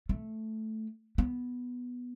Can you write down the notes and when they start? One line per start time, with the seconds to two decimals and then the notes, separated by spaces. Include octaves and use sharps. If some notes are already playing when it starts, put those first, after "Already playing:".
0.09 A3
1.18 B3